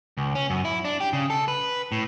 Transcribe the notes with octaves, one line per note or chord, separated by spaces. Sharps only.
C#2
C#4
F#2
E4
D4
G4
C#3
A4
B4
A2